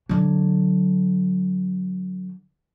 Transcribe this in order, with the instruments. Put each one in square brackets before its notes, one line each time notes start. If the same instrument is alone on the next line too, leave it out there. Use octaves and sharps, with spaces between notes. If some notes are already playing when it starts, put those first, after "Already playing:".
[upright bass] D3 F#3